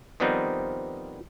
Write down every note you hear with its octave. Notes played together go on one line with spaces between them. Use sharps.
D#3 F3 G3 B3 C4 D#4